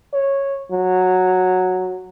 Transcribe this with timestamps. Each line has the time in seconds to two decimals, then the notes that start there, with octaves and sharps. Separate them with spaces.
0.14 C#5
0.72 F#3